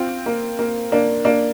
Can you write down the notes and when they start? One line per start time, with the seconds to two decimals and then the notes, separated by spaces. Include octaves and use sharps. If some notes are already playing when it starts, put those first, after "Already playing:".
Already playing: C4 F4
0.26 A#3
0.59 A#3
0.92 A#3 D4
1.25 A#3 D4